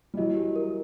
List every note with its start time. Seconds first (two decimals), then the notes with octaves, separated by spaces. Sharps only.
0.14 G3
0.17 E3 F#3 D#5
0.36 G4
0.56 A#4